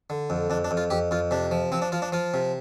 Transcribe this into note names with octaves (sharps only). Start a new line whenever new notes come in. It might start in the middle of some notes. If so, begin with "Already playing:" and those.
D3
F2
F2 D4
D4
F2
F4
F2 G4
F2 F4
C3 D4
F3
F3 C4
D4
F3 F4
D4
F3 F4
C3